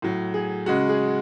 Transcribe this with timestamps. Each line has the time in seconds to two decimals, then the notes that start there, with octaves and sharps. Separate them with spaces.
0.02 A2 F#3
0.34 G#4
0.66 C#3 G#3 F#4
0.89 G#4